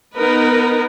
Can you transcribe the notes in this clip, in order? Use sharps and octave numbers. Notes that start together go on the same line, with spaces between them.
B3 D#4 A#4 B4